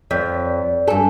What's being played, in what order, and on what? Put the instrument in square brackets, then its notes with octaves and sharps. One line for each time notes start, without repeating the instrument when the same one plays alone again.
[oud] F2 [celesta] C#5 G6 B6 [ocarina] D5
[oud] G2 A4 [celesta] G#5